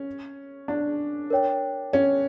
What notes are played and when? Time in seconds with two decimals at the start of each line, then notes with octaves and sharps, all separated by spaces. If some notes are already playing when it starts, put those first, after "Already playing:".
Already playing: C#4
0.68 D4
1.30 A#4 C#5 G5
1.93 C#4